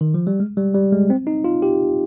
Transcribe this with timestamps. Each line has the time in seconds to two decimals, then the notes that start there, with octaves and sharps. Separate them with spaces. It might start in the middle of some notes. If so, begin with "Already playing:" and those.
0.01 D#3
0.14 F3
0.27 G3
0.40 G#3
0.57 G3
0.74 G3
0.92 G#3
1.10 C4
1.27 D#4
1.44 F4
1.62 G4